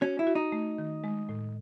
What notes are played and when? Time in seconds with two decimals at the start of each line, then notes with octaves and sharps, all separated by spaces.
0.01 C#4 F#4
0.19 E4
0.27 F#4
0.35 D#4
0.52 A3
0.78 D#3
1.04 G#3
1.29 A2